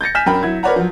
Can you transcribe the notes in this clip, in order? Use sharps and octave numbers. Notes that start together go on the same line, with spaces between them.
G6 A6 A#6 C#7
G#5 F6 G6 B6 E7
F#2 A#4 G5 B5
F#3 E4 G#6
A#4 B4 C#5 D5 F#5 A#5
F3 F#3